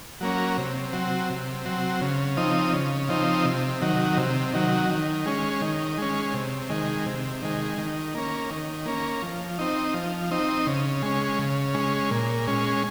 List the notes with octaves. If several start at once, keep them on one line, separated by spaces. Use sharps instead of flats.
F#3 A#3 C#4
C3
F#3 C4
C3
F#3 C4
C#3
F3 C4 D#4
C#3
F3 C4 D#4
C3
D#3 F#3
C3
D#3 F#3
D#3
G#3 C#4
D#3
G#3 C#4
C3
D#3 G#3
C3
D#3 G#3
D#3
A#3 C#4
D#3
A#3 C#4
F3
C4 D#4
F3
C4 D#4
C#3
G#3 C#4
C#3
G#3 C#4
A#2
G#3 C#4